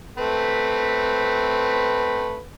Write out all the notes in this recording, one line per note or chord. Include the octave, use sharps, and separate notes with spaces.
A3 C4 B4